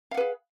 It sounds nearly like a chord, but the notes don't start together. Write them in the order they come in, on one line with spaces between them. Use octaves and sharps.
F5 F#5 B4 G#4